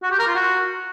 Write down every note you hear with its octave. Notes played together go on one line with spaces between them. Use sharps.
F#4
G4
A#4
F4
F#4